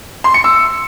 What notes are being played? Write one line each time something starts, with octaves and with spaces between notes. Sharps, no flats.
C6
C#7
E6